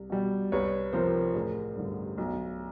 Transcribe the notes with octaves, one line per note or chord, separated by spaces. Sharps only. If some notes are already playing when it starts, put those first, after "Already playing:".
Already playing: C2
B2 G3
C2 B4 C#5
C3 F3 A#4 C5
A1 G#4 A#4
G2 D3
B1